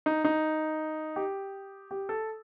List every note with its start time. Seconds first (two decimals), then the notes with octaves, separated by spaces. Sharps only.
0.06 D#4
0.25 D#4
1.16 G4
1.91 G4
2.09 A4